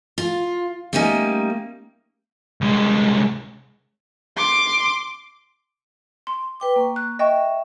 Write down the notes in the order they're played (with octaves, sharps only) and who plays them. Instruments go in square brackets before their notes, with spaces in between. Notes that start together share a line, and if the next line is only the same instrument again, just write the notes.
[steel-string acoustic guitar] F4
G3 A3 A#3 C#4 D#4
[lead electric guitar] C2 G#3
[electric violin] C6 D6
[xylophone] C6
[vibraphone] B4 G5 D6
A#3 C#6
[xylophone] F#6
[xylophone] D#5 G5 C#6 [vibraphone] E5